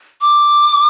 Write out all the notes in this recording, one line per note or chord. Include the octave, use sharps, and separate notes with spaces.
D6